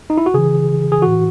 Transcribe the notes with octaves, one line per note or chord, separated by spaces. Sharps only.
D#4
E4
F#4
C#3 E3 G#4
G#4
A2 E3 F#4